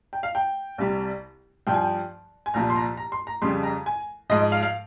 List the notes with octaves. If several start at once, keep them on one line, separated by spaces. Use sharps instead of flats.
G5
F5
G5
C2 C3 G3
G2 F3 G5
G#5
G5
G#5
C2 A#2 F3 A#5
C6
A#5
A#5
C6
A#5
F2 C#3 G3 C6
A#5
G#5
G#2 F3 D#5
D#5
F5
F5